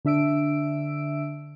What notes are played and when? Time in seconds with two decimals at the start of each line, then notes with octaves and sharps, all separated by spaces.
0.05 D3 D4 E5 E6 D7